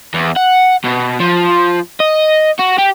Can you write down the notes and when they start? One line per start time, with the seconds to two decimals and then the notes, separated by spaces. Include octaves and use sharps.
0.14 E2
0.37 F#5
0.84 B2
1.20 F3
2.00 D#5
2.59 F#4
2.78 G4